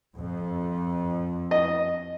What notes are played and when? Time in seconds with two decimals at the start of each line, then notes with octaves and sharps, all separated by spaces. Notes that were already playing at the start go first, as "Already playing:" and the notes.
0.15 F2
1.51 D#5